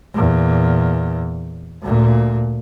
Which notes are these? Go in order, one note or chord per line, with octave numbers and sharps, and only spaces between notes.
E2 A#2
D2 A#2